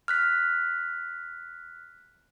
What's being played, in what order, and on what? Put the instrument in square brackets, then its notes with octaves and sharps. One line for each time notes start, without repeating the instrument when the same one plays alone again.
[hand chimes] F6 F#6 B6